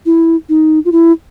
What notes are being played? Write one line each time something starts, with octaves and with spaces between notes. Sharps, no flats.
E4
D#4
F4
E4